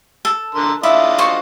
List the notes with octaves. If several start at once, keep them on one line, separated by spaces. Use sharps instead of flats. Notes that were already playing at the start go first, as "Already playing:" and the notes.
A4
D3 A#4 C6
D4 E4 F4 D#5
F#4 C5 C#6